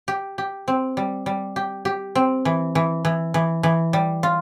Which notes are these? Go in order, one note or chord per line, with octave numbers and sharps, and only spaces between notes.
G4
G4
C4
G3
G3
G4
G4
C4
E3
E3
E3
E3
E3
G3
F4